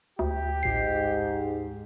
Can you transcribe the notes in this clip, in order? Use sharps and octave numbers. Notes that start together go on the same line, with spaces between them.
D2 G4
A1 G#2 C7